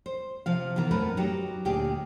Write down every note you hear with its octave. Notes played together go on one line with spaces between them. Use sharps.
C5
C3 F3 F5
D#3 E3 B3 A#4
F#2 A2 A3 C4 A#4 B4
F#3 D#4 G4
D2 A#2 G4 G#4